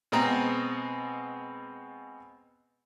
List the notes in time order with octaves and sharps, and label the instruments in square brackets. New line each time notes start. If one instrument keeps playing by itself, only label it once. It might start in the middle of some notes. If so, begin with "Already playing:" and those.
[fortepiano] B2 G#3 B3 C4 A#5